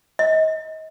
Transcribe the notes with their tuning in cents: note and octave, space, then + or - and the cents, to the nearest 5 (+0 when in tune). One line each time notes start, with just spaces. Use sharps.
D#5 +30